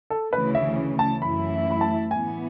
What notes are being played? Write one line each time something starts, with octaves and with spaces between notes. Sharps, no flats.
A4
D2 C#3 E3 B4
E5
A5
F#2 E3 A3 E4 B5
B5
A5
A2 E3 B3 G#5